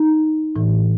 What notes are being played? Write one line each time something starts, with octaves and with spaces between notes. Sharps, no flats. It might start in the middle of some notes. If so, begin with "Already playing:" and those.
Already playing: D#4
A2 E3